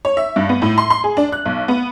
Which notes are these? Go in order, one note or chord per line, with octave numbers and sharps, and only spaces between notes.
C#5
E5
G2
B3
A2
C6
C6
G#4
D4
F#6
B1
B3